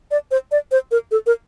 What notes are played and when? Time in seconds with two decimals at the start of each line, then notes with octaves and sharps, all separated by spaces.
0.11 D5
0.31 C5
0.51 D5
0.71 C5
0.91 A#4
1.11 A4
1.26 A#4